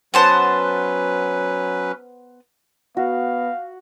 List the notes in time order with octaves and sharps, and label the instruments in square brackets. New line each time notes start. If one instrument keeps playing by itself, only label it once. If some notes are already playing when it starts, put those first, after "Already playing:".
[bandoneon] F#3 C#4 B4 [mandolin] B3 C5 A5
[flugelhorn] B3 [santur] F#4 [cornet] F5